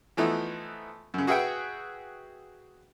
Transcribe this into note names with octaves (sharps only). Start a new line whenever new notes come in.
E3 F3 A3 B3 D#4 E4
F#2 C#3
F#4 G#4 B4 E5 F#5 G5